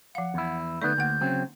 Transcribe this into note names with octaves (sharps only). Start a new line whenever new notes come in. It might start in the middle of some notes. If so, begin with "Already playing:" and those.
F3 F5 F#5
E2 E4
D3 A3 B3 D#4 D5 G6
D2 A#3 F#5
C#3 F#3 C4